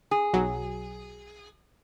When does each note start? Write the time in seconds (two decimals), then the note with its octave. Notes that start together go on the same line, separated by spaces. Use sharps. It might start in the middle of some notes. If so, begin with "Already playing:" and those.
0.11 G#4
0.34 B1 F#3